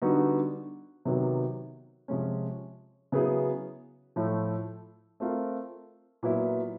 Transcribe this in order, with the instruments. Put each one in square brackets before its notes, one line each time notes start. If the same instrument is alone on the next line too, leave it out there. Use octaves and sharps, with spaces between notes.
[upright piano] D3 G3 B3 D#4 F#4
C3 D#3 F#3 B3
C3 F3 G#3 C#4
C#3 F#3 B3 E4 G#4
A2 F3 A3
A3 C4 F4 A#4
A#2 F#3 B3 E4